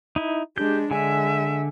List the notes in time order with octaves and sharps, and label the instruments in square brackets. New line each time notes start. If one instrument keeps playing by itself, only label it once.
[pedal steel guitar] D#4 E4
[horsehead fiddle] G#3 D4 [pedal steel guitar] G4 G6
[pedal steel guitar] D3 G#5 [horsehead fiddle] G#3 E5